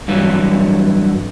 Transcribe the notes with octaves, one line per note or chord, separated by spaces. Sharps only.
G2 E3 F#3